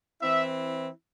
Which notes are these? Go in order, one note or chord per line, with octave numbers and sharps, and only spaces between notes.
E3 C4 E4 E5